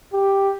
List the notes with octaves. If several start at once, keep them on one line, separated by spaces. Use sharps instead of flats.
G4